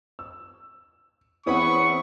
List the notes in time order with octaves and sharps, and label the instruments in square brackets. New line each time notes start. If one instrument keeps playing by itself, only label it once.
[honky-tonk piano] E6
[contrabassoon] E2 [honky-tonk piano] C4 C#4 E4 [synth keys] F#5 B5 D#6 [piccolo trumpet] C#6